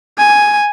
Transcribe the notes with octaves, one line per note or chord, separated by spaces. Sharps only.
G#5